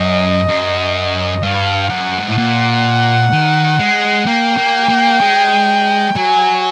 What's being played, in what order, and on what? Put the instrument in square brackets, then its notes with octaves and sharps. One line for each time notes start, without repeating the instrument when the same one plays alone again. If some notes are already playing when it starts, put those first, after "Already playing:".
Already playing: [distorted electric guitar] F#2 [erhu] D#5
[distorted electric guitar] F#2
[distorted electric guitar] G2 [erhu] F5
[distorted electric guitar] F#2 [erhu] F#5
[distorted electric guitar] G#2
A2
[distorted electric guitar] A#2 [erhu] F#5
[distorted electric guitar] D#3
G#3
[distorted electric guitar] A#3 [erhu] G5
[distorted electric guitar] A#3
A#3
G#3
[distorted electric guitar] F#3 [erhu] G#5